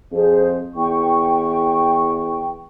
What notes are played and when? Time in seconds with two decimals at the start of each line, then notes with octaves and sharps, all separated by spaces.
0.12 F2 G#4 C5
0.75 E2 G5 C#6